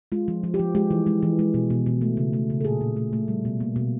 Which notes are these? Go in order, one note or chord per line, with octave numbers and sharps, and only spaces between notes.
G#3 F4
F3
F3
G4
F3
G#3 G4
E3
G#3
E3
G#3
B2
B2
B2
A3
C#3
A3
C#3
A4
A#2 G#4
A#2
A3
A3
G3
B2
A#3
B2